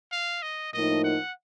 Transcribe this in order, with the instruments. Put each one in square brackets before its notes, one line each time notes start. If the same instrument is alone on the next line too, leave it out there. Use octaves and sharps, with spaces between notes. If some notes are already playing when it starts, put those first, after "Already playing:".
[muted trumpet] F5
D#5
[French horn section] A2 F3 A#3 D#4 [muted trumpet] D#5
[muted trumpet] F#5